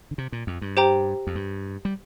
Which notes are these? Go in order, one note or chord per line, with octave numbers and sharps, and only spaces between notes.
D3
C3
A#2
F2
G2
G4 C5 G5 A#5
F2
G2
G3